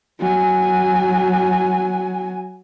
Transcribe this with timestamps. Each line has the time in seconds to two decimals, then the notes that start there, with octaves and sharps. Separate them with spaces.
0.19 F#3 G#5